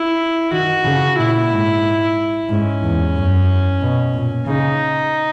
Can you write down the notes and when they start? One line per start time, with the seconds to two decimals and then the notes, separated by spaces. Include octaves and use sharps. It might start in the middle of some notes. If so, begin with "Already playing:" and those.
Already playing: E4
0.52 D#3 F#4
0.85 C#3
1.18 A#2 E4
1.51 G#2
2.49 G#2 C#4
2.83 E2
3.15 F#2
3.81 B2
4.14 A#2
4.47 C#3 D#4